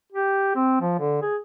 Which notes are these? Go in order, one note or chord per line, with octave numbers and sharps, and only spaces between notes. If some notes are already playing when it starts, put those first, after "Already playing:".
G4
C4
F3
D3
G#4